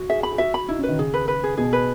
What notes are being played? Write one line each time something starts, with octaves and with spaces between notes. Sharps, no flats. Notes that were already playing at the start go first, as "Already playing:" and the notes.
Already playing: F#4
G#4 E5
B5
G#4
F#4 E5
B5
D#4 E4
C#4
B4
D#3
C#3 G#4
B4
B4
G#4
B2 G#4
B4